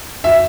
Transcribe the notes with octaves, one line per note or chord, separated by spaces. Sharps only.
E5